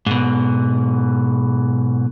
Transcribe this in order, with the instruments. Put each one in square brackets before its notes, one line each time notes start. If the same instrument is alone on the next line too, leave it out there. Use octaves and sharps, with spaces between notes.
[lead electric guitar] G#2 B2